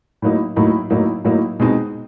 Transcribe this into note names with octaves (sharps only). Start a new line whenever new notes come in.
A2 F#3 A#3 D#4
A2 F#3 A#3 D#4
A2 F#3 A#3 D#4
A2 F#3 A#3 D#4
B2 G#3 C4 D#4